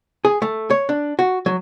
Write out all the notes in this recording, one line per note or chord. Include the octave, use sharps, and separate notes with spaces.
G#4
A3
C#5
D4
F#4
F#3